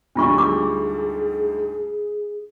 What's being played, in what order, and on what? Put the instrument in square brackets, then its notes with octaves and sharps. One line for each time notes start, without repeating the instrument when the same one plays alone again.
[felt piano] D2 G#2 G3 [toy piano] D4 F4 C#6
[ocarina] G#4 [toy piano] D6